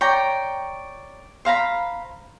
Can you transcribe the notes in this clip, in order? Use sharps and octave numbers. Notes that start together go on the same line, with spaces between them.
C#5 D5 G5 A#5
C5 F5 A#5 B5